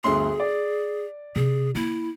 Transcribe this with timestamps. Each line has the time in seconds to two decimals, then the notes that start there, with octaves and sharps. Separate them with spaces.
0.04 G1 D2 G#4 C6
0.40 D5
1.36 C3 G#4
1.75 A#3 E4